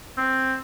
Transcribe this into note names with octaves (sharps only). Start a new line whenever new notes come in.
C4